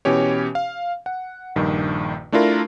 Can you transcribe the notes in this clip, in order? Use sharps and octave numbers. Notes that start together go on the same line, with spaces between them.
B2 E3 C#4 G4 C#5
F5
F#5
A#1 G2 D#3
A3 D4 E4 F4 A#4